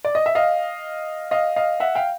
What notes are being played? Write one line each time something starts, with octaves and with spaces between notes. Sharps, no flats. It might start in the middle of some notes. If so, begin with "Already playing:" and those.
D5
D#5
E5
D#5 F5
D#5 F5
D#5 F5
E5 F#5
F5 G5